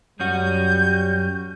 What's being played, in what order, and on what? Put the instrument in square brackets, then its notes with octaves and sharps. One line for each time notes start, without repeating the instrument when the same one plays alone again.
[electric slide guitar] F#2 C#4 F#4 [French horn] G3 [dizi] G6